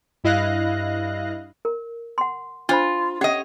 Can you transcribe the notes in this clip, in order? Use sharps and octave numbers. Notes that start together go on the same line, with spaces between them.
G2 E4 D#5 F5 F#6 A#6
A#4
F#5 C6
D4 F4 C5 B5
C#4 G4 C#5 D#5 F#5